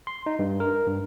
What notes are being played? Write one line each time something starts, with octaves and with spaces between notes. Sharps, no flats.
C6
D#4
G2
A#4
G2